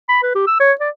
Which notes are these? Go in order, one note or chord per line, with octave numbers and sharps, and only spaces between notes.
B5
B4
G4
E6
C#5
D5